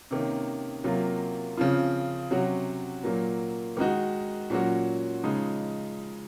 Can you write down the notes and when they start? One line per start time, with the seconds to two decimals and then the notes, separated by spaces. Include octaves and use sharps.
0.11 C3 D#3 A#3 C#4
0.84 C3 F#3 A#3 F4
1.57 C#3 F3 C4 F4
2.31 C3 F#3 C#4 F#4
3.04 A#2 F#3 A#3
3.77 D#3 G#3 D#4 F#4
4.50 A#2 F#3 C#4 F#4
5.23 C#3 F3 G#3 D#4